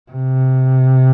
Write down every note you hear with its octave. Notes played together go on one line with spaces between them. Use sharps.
C3